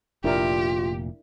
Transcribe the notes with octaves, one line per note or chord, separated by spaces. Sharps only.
F1 A#2 D4 E4 F4 G4 A#4